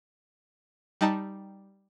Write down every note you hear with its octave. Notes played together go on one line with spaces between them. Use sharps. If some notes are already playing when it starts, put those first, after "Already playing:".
G3 D#4 A5